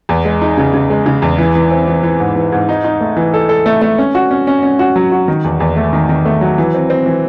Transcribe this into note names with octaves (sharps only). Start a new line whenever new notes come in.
E2
G#3
D#4
C#3
C#3
G#3
C#3
E2
E3
E3
C4
E3
E3
G#2
E3
G#2
D#4
D#4
A3
E3
A4
A4
A3
A3
C#4
F#4
C#4
C#4
C#4
F#4
F#3
F#4
D#3
E2
E2
A3
D#3
D#3
A3
F#3
E3
C4
C4
E3